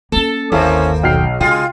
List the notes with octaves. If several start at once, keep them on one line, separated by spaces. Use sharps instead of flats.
A#3 C#4 A4
G1 D#2 A#3 C4 C#4 E4 A4 F5
B1 G5 F6 C7
C#3 G#3 F4 G5